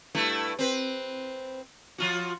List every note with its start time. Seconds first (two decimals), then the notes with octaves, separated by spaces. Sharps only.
0.15 G2 A3 E4
0.59 C4 B4
1.98 F3 F4 F#4